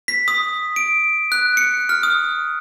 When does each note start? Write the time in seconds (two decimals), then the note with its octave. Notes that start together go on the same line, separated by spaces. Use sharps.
0.08 B6
0.28 D#6
0.76 D7
1.32 F#6
1.57 C#7
1.89 F6
2.03 D#6